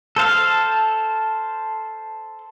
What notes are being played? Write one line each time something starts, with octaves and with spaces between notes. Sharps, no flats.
A4 C5 F5